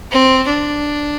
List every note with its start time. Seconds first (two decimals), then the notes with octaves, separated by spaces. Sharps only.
0.11 C4
0.47 D4